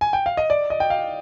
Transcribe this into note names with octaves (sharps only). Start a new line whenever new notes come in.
G#5
G5
F5
D#5
D5
D#5
G5
F5